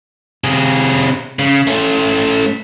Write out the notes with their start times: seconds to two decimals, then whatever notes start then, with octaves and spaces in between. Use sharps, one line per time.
0.44 C3 G#4
1.39 C#3
1.67 A3 C#4